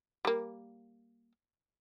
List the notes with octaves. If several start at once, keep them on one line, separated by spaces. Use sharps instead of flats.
G3 A#3